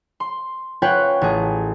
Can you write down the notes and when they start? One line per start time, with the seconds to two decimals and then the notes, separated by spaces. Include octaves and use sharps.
0.20 C6
0.82 C#4 F4 B4 C#5 F#5 G5
1.21 A1 G#4